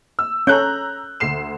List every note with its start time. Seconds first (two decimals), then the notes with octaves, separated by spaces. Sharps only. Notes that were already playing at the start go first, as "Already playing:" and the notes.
0.19 E6
0.47 C#4 A4 A#5 F#6 G6
1.20 D2 C7 E7